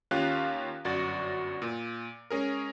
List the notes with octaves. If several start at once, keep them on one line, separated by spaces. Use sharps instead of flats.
D#2 C#4 F4 G4 F5 F#6
G1 F#2 F#4 D5 A6
A#2
G#3 C#4 G#4 A#4